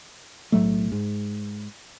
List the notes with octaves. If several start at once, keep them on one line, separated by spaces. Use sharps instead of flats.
B1 A2 F#3 A3
G#2